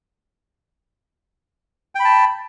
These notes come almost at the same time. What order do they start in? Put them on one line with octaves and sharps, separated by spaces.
G5 B5 A5